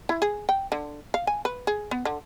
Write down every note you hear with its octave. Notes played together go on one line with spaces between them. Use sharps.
E4
G#4
G5
D3
F5
G#5
B4
G#4
B3
D3